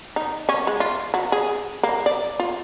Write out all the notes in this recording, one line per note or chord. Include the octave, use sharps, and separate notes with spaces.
D#4
C#4
G#3
F4
F#3
G#4
A#3
D5
F4